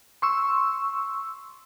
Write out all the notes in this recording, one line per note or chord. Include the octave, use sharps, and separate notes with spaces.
C6 C#6 E6